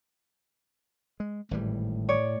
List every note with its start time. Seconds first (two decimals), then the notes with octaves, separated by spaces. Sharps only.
1.20 G#3
1.51 G#1 A2 E3 G3
2.09 C#5 D5